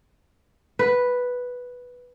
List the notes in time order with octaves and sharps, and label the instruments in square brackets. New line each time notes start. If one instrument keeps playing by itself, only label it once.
[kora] B4